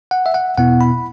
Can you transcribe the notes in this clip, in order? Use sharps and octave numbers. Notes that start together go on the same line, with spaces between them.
F#5
E5
F#5
E2 B2 B3 E4 F#5
B5